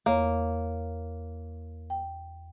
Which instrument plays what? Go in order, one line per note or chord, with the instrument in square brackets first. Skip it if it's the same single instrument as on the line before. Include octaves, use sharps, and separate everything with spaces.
[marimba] E2 C#5 [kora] A#3
[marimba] G5